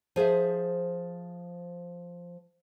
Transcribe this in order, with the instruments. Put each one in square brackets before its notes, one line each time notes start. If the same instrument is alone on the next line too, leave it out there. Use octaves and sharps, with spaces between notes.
[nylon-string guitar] F3 G#4 C5 E5